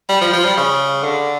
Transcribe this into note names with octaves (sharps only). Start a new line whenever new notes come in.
G3
F3
F3
G3
C#3
D3